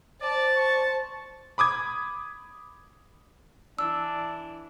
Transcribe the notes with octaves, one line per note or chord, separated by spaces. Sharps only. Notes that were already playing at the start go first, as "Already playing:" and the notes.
C5 D5 A5
C#6
B5 D6 D#6 G#6
E3 D4 E6